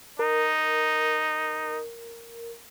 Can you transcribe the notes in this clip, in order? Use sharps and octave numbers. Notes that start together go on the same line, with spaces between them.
D#4 A#4